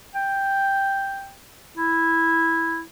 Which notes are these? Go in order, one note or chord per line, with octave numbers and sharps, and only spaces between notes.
G5
E4